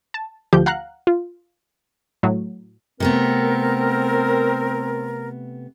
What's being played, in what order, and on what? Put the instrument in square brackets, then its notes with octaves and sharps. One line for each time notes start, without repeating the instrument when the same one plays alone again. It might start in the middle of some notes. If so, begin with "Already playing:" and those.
[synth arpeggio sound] A5
D2 F3 G4 G6
F5 F#5 A#5 F#6
F4
A2 F#3
[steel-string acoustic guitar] C3 A3 B3 [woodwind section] C4 A#4